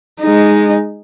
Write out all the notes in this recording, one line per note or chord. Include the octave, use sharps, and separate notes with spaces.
G#3 D#4